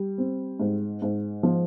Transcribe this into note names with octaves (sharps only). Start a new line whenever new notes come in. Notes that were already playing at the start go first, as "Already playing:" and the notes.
Already playing: G3
C4
G#2
G#2
F3